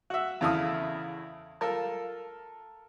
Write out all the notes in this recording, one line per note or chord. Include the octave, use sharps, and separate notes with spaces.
F#4 E5
E2 C#3 E4 A4 F5 D#6
F4 A4 A#4 A5